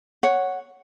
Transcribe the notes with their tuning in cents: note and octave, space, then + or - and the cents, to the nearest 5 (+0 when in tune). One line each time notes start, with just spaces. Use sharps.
C#5 +0 F#5 +0